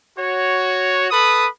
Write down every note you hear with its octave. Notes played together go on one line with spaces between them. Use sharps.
F#4 C#5
A4 B4 B5 D#6